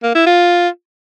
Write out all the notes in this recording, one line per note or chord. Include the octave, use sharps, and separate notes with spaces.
A#3
E4
F4